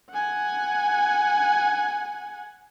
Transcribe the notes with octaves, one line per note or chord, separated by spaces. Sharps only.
F#5 G#5